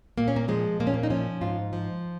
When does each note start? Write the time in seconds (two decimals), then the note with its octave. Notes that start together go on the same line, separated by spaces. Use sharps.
0.18 A#2 A#3
0.28 C#4
0.36 A#3
0.48 F3 G#3
0.80 A#2 A#3
0.87 C#4
0.94 A#3
1.03 D#4
1.10 F3 C#4
1.41 G#2 F4
1.73 F3